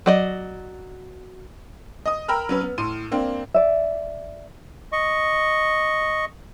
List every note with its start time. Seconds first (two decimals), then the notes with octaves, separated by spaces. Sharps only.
0.06 F#3 D5 D#5
2.06 D#5 D#6
2.28 A#4 G5 A#5 B5 E6 F6
2.49 F#3 C#4 B4
2.61 B3
2.78 A2 C6 D#7
3.12 A#3 C4 D4
3.54 D5 E5
4.92 D#5 C#6